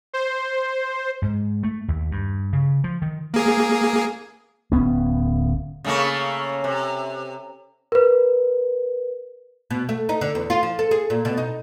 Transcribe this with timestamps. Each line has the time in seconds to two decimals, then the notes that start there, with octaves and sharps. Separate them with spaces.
0.13 C5
1.22 G#2
1.63 A3
1.88 D#2
2.12 G2
2.53 C#3
2.84 F3
3.02 D#3
3.34 A#3 G#4
4.72 D1 B3 C#4
5.84 C#3 A3 A#3
6.64 C3
7.92 A#4 B4
9.70 B2
9.89 A3
10.09 D#4
10.21 D3
10.35 E2
10.50 F4
10.63 F3
10.79 A4
10.91 G#4
11.10 A#2
11.25 B2
11.38 D#4